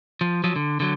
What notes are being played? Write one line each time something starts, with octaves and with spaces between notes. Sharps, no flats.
F3
F3 F#3
D3
D3 F#3